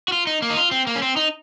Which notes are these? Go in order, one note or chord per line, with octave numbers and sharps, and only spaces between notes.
F#4
F4
D#4
A#3
D#4
F4
C4
A#3
C#4
C4
D#4